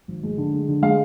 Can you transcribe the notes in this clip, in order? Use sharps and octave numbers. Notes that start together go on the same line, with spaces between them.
G#1
G#3
D3
G#3
D3
G#3 F5